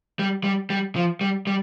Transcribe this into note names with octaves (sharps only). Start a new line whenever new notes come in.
G3
G3
G3
F3
G3
G3